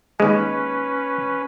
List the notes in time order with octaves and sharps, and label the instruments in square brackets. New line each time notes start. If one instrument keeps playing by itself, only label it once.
[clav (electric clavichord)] D#2 G#3 [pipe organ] C#4 B4